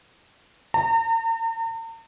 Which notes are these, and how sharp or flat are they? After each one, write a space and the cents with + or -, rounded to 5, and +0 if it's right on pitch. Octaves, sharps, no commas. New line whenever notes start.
A#5 -45